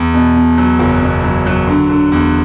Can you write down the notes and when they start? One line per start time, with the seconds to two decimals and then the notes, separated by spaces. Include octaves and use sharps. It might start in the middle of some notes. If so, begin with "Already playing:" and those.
Already playing: E2
0.14 B2
0.35 B2
0.58 F#3
0.79 F#1
1.02 B2
1.23 F#3
1.46 F#3
1.67 D3
1.89 D3
2.12 E2